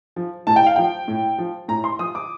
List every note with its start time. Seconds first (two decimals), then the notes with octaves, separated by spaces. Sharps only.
0.16 F3
0.47 A2 A5
0.56 G5
0.66 F5
0.76 F3 G5
1.08 A2
1.38 F3
1.68 A2 A#5
1.84 C6
1.99 F3 D#6
2.15 D6